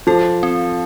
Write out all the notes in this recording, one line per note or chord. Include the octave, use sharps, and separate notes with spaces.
F3 A4
C4